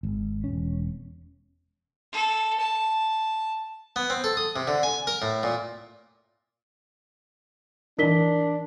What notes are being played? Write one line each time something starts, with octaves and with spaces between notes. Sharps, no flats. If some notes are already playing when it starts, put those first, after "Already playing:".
G#1
E1 C#4
A4
A5
B3
C4
A4
D#6
C3
D3
G#5
A#4
A2
A#2
E3 D4 D#4 A#4 B6 G7